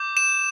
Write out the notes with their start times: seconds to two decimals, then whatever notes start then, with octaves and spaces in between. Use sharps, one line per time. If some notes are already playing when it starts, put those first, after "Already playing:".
Already playing: D6 G6
0.17 E7